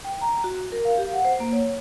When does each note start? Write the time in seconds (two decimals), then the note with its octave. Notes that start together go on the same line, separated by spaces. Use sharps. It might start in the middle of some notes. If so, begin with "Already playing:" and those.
0.04 G5
0.21 A#5
0.44 F#4
0.72 A#4
0.85 F5
0.98 G4
1.13 F#5
1.25 C5
1.40 A#3
1.52 C#5